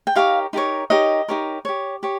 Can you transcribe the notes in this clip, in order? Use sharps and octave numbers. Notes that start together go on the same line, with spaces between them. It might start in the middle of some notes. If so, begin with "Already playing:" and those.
G5
D#4 G4 A#4 C#5 F5
D#4 G4 A#4 C#5
D#4 G4 A#4 C#5 D#5
D#4 G4 A#4 C#5
G4 C#5
G4 C#5